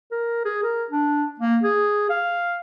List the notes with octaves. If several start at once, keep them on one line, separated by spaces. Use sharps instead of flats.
A#4
G#4
A#4
D4
A#3
G#4
F5